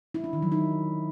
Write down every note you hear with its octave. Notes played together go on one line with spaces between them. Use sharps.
E4
D4
D#3
F#3
D#4